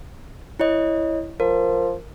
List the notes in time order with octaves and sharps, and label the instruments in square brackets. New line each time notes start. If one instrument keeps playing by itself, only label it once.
[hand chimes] E4 C#5 D#5
[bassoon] F3 [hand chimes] A#4